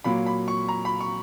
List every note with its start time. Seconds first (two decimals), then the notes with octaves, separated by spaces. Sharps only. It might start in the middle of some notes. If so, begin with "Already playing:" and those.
0.04 A#2 F#3 A#3 B5
0.26 B5
0.48 C#6
0.68 A#5
0.85 B5
1.00 C#6